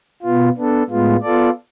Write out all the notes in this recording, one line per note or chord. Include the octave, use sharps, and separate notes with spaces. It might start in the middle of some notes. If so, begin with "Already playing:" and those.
B2 B3 F4
B3 D4 A4
A2 G#3 B3 F4
B3 F4 A4 D5